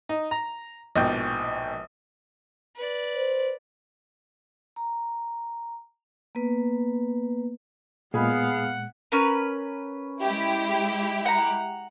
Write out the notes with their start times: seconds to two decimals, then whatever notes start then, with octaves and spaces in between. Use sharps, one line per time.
0.09 D#4
0.31 A#5
0.96 A#1 G#2 B2 G5
2.76 B4 D5
3.16 C5
4.76 A#5
6.35 A#3 B3 B4
8.14 A#2 G#3 B3 G#4 F5 F#5 B5
9.12 C#4 A#4 B4
10.21 G#3 E4 G4
11.26 F#5 A#5